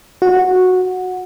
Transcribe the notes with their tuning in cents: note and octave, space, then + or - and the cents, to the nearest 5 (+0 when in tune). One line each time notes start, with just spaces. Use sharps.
F#4 -10